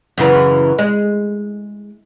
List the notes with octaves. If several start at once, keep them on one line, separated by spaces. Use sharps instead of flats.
F#2 C#3 E3
G#3